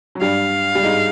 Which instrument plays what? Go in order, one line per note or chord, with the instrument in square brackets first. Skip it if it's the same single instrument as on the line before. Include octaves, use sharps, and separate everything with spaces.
[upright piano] F#3
[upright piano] G2 G3 [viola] F5
[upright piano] G3
G#2 G#3